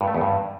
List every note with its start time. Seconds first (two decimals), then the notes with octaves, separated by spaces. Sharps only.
0.01 G2
0.08 A3
0.14 E2
0.21 G2